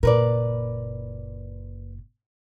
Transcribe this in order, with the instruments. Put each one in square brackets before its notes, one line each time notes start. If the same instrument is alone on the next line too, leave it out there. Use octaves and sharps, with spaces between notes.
[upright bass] F#1 A#2 [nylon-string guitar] A#4 B4 D5